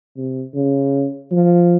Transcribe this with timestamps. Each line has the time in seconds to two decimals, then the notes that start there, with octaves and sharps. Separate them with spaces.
0.17 C3
0.54 C#3
1.31 F3